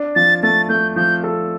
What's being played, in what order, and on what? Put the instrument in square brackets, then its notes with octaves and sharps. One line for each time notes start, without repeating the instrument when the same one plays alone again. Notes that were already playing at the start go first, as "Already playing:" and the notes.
Already playing: [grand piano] D4
[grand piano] F3 [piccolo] A6
[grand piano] A3 [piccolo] A6
[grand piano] A3 [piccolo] G6
[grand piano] F3 [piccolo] G6
[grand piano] A4